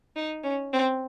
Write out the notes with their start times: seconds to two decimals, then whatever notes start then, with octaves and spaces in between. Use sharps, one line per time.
0.16 D#4
0.43 C#4
0.73 C4